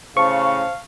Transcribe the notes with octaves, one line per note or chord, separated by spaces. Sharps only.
A2 C#3 C5 F5 A5 C#6